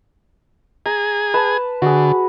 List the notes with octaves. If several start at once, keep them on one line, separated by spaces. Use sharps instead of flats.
G#4 A#5
B4 A5
D3 F#4 G#4